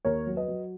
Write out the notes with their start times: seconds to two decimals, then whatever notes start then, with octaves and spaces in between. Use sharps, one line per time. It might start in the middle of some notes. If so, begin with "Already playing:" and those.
0.05 D#2 A#4 C#5
0.27 F#3
0.37 B4 D#5
0.48 F#3